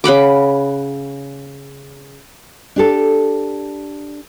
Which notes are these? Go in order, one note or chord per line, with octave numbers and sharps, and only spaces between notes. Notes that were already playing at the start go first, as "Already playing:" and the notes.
C#3 F#5 B5 D6
D4 G4 A4